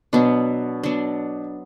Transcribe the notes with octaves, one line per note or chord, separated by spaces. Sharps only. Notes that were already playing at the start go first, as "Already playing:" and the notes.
B2 F#3 B3 D4
F#3 B3 D4